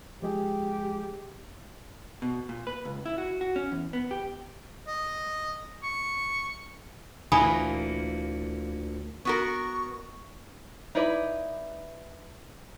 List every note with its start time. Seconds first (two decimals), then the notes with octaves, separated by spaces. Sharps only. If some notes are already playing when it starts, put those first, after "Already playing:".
0.22 F3 G#3 G4 G#4
2.22 B2
2.49 A#2
2.67 B4
2.85 C#2
3.06 E4
3.18 F#4
3.41 F#4
3.56 C#4
3.72 E2
3.93 B3
4.11 G4
4.87 D#5
5.83 C#6
7.32 D2 A#2 E3 A#3 G#5 B5 D#6
9.25 B3 F#4 A#4 C#6
10.95 D#4 E4 B4 D5